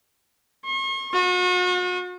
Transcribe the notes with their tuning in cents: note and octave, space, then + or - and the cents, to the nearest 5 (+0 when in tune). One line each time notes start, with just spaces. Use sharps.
C#6 -45
F#4 -40